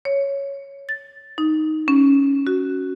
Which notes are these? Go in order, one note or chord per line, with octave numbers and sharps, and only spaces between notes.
C#5
A6
D#4
C#4
F#4